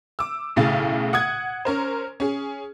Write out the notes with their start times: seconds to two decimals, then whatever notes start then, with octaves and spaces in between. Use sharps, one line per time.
0.19 D6 E6
0.56 B1 A2 C#3 G#4 F5 A6
1.13 F#5 D#6 G#6
1.65 C#4 A#4 C5
2.20 C#4 G#4